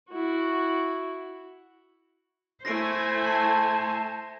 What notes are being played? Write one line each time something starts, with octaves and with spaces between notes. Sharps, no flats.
E4 F#4
A3 E4 C5 G#5 A#6 C7 D7
A5 C6